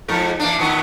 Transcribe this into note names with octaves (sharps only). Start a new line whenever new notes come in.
F2 G#2 A#4
E3 A#3 D4
A2 D#3 B3